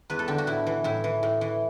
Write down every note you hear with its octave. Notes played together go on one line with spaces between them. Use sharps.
E2 B4
A4
D3 G4
F#4
A2 E4
E3
A2 E4
E3
A2
E3